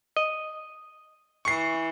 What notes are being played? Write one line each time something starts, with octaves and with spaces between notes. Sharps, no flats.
D#5
E3 C#6 C7